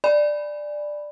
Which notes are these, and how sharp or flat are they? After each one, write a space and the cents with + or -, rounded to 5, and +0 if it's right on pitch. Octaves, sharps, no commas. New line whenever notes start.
D5 +10 G#5 -15 B5 +0